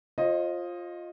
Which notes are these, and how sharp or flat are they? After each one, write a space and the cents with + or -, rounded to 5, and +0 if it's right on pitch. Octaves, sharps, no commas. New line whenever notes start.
F4 +5 C5 +40 D#5 +0